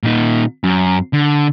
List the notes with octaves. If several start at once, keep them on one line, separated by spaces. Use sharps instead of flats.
A#2 D#4
F#2
D3